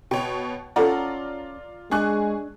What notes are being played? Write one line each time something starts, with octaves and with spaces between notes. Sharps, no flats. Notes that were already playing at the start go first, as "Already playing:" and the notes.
B2 C#5 G5
C#4 F4 A4 D5 F#5 A#5
G#3 D4 G#4 C#6 F#6